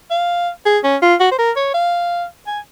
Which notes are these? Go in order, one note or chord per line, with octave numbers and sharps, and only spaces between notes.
F5
G#4
C#4
F4
F#4
C5
A#4
C#5
F5
G#5